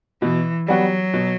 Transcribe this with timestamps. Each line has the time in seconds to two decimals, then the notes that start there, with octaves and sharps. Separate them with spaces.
0.22 B2 E3
0.68 F#3 G3 B3 F#4
1.13 B2